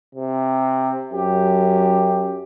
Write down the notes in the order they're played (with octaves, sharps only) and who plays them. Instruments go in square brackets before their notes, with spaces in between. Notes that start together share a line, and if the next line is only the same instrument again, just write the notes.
[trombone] C3
[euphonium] F#2 [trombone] G4